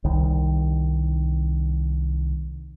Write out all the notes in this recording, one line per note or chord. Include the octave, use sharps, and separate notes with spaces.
C2 D#3